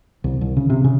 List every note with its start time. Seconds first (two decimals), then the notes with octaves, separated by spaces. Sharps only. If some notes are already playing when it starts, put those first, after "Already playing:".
0.24 C2
0.41 C2
0.57 C#3
0.70 C3
0.84 C#3